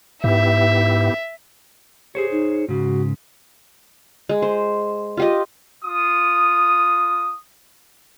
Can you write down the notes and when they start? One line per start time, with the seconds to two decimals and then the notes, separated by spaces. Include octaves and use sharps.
0.24 G#2 B3 E4 G4 E5
2.15 G4 G#4 C5 C#5
2.32 D#4
2.69 G#2 C#3 F#4
4.29 G#3
4.42 C5
5.17 F4 G4 D#5
5.83 F4 D#6